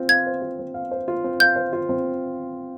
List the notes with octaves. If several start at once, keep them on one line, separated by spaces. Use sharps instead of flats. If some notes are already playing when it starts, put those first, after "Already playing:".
Already playing: C4 F4
F5 G#6
C5
F4
C4
F5
C5
F4
C4
F5 G6
C5
F4
C4